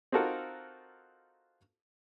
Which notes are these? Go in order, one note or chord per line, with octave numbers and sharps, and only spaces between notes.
C4 D#4 F4 F#4 A4 A#4